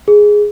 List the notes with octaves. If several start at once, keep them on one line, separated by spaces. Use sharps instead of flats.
G#4